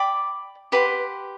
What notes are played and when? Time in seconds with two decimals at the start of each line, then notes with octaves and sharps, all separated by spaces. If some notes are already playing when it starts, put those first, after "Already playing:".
Already playing: D5 G5 B5 D6
0.72 G4 B4 F#5 C6